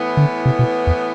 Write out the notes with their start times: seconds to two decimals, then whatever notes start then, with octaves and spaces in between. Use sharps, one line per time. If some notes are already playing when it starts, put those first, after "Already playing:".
Already playing: A2 E3 B3
0.17 D3
0.46 C3
0.59 B2
0.87 E2